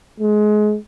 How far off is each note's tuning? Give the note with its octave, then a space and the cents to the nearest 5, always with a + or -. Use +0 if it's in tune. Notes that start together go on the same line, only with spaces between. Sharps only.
G#3 +25